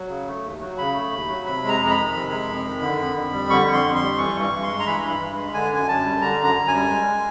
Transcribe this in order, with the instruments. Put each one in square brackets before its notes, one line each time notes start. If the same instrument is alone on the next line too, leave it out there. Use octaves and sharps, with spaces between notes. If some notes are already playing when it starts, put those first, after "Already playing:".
Already playing: [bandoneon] F#3
C#3
A3
D#2
F#3
C#3 B5
A3
D#2
F#3
C3 B5
G#3
A#5
F2
A#5
B5
D#3
C3
G#3
F2
D#3
D3
F2
F2
G3
D3 C#6
F2
C6
F2
C6
G3
E3 C#6
G2
C#6
G2
C6
G#3
A#5
E3 B5
G2
B5
G2
G#3
D3 G#5
F#2 G#5
F#2 A5
G3
D3 A#5
F#2
A#5
F#2
G#5
G3
G#3
G#3